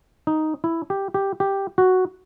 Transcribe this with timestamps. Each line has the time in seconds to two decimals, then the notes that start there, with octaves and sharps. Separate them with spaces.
0.27 D#4
0.64 E4
0.90 G4
1.14 G4
1.40 G4
1.78 F#4